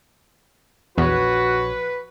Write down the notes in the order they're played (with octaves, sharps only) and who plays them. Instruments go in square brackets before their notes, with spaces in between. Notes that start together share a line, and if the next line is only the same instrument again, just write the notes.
[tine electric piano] A#1 C#5 [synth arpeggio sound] E2 [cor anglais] F#4 [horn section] B4